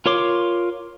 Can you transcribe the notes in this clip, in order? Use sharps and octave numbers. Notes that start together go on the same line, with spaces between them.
F4 A#4 C#5 C6 D6